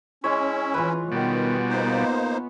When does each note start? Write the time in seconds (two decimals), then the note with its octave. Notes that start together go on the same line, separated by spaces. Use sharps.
0.24 G#3 C#4 E4 C#5
0.74 E3 F4 B4
1.12 B2 D#3 G3 B3
1.69 A#3 D#4 C5